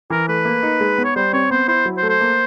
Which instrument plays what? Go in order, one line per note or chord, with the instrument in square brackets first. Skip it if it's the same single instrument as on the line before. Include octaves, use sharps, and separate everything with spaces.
[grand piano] E3 [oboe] A#4
[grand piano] A3 [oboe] B4
[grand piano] A#3
D#4
G#3
B3
[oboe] C#5
[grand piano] G3 [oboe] C5
[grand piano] C4 [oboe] C#5
[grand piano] B3 [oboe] C5
[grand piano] E4 [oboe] C5
[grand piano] F#3
[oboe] C5
[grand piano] A3
[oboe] C5
[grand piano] A#3